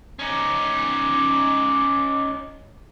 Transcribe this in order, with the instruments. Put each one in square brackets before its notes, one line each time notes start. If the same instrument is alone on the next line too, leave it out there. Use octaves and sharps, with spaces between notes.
[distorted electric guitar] C#4 D#4 [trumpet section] D6